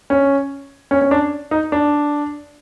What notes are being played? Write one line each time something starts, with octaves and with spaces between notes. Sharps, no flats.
C#4
C#4
C#4
D4
D#4
D4